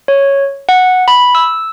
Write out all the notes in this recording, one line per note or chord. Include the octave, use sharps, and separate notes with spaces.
C#5
F#5
B5
E6